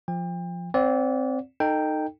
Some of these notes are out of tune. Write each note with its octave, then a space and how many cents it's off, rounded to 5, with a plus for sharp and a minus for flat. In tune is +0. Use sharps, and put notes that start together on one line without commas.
F3 +0 G5 +35
C4 +0 D5 -30 F#5 -30
D#4 -15 A4 +20 G5 +0